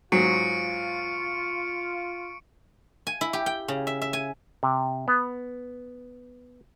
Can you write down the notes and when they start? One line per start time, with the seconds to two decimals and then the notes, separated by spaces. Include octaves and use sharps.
0.12 G#2 F#3 F4 C#6 C#7 D7
3.07 G#5
3.21 E4
3.33 G4
3.46 G5
3.68 C#3
3.87 E5
4.02 E5
4.13 G#5
4.63 C3
5.08 B3